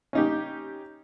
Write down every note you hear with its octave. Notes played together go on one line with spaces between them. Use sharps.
C#4 D#4 G4